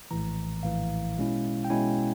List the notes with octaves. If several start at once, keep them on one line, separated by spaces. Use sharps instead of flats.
A#1 A2 E3 A#5
A#1 A2 E3 F5
B2 G#3 C#4 E4
G5
B2 G#3 C#4 E4 G#5